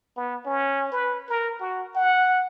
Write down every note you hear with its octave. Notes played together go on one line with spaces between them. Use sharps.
B3
C#4
B4
A#4
F#4
F#5